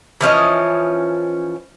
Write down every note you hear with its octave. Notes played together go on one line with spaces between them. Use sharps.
E3 F3 C#4 D#5